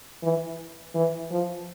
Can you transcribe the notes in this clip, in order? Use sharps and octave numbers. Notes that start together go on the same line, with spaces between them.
E3
E3
F3